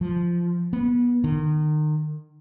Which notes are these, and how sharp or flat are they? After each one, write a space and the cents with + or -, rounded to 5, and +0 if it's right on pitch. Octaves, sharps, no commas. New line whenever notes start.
F3 -10
B3 -25
D#3 -35